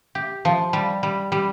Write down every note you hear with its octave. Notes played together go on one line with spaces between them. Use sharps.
G4
F3
G3
G3
G3